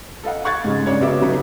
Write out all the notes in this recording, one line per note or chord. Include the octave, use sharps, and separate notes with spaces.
A4 D#5 F5 F#5
F5 C#6 F#6 G#6 A6
G#2 C#3 G#3
C#3 D4 C#5 G#6
C#3 B3 F#4 E5 D6
G1 C#3 F#3 B3 D#4 B4